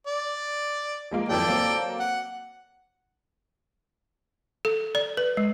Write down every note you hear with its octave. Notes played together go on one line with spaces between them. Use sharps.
D5
F3 G#3 A#3
F2 E3 F#3 A4 D5 G5
F#3 A#3 C4
F#5
A4
D5
B4
G#3